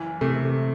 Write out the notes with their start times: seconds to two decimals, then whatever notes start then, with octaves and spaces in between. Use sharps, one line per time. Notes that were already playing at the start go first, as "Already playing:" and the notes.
Already playing: F#1 E3
0.21 C3 A3